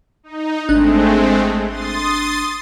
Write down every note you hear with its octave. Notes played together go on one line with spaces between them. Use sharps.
D#4
G#1 G#3 A3 C4 D4 F#6
C6 D#6 A6